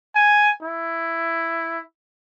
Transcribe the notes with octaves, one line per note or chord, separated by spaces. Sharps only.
G#5
E4